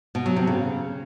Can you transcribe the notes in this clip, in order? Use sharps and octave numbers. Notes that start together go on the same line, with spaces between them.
B2
F#3
C3
C#3